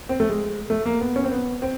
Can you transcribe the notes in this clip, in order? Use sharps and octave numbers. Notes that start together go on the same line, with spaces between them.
C4
A3
G#3
A3
A#3
B3
C#4
C4
B3
C4